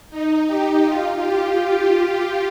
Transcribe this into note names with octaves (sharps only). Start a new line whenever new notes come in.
D#4
G4
F4
G4